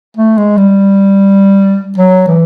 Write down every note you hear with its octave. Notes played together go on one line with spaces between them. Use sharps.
A3
G#3
G3
F#3
E3